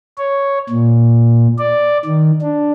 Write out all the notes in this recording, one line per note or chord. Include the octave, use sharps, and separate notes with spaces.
C#5
A#2
D5
D#3
D4